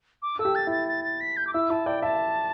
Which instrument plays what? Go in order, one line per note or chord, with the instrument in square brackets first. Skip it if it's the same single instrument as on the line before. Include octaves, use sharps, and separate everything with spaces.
[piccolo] D6
[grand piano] A4 [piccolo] E6
[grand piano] G4
[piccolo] A6
[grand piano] E4 [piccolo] A6
[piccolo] A6
A6
B6
G6
D6
[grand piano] E4 [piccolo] E6
[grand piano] E4 [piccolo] A5
[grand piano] D5 [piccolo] G5
[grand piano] E5 [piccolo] A5